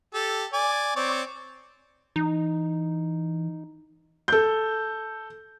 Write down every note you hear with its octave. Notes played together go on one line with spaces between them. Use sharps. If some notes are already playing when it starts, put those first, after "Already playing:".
G4 A4
D5 G#5
C4 C#5 D5
E3 D#4
A4 G6